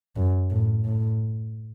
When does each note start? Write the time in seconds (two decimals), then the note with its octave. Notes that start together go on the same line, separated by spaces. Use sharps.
0.16 F#2
0.51 A2
0.85 A2